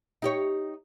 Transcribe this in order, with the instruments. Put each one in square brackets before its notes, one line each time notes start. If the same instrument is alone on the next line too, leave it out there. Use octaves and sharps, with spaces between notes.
[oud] D#4 G4 C#5